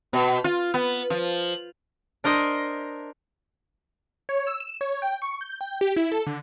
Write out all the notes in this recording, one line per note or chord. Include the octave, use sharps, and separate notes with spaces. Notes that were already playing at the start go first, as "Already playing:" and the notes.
B2
F4
B3
F3
D4 A#4 C5 D#5
C#5
E6
E7
C#5
G5
C#6
G6
G5
G4
E4
A4
D3